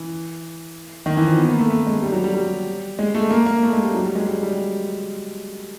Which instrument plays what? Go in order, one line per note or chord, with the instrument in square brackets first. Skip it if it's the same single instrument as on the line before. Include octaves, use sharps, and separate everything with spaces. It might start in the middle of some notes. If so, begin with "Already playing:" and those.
Already playing: [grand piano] E3
D#3
E3
F3
B3
A#3
A3
A3
G#3
G3
F#3
G3
G3
G#3
A3
A#3
A#3
A3
G#3
G3
F#3
G3
G#3
G3
G3